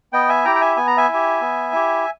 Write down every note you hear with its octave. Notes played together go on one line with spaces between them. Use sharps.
B3 D#5 G5
E5 G#5
E4 G4 G5 A#5
G5
E5 G#5
B3 G#5
A#5
E5 G#5
E4
G4
B3
E4 G4